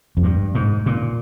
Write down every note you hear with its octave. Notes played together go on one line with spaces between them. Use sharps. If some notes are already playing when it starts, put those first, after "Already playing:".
F2
G2
G#2
A#2